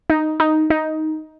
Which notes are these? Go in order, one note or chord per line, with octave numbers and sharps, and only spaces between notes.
D#4
D#4
D#4